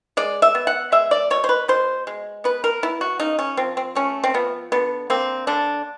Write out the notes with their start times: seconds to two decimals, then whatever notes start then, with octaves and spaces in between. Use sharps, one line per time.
0.17 G#3 D5
0.42 E5
0.55 B3
0.67 F#5
0.92 G#3 E5
1.11 D5
1.30 B2 C#5
1.44 C5
1.49 B4
1.68 B2 C5
2.07 G#3
2.44 B3 B4
2.64 A#4
2.83 B3 E4
3.01 F#4
3.20 C#3 D#4
3.39 C#4
3.57 F3 C4
3.77 C4
3.95 A3 C#4
4.24 C4
4.34 F3 B3
4.72 D3 B3
5.10 A#3 C4
5.47 D3 D4